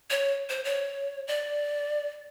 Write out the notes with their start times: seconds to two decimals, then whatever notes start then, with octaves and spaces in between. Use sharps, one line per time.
0.10 C#5
0.49 C5
0.64 C#5
1.28 D5